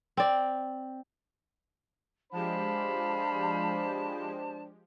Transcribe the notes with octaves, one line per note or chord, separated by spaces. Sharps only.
C4 D5
F3 G#3 D4 G4 C5 F5 A5 B5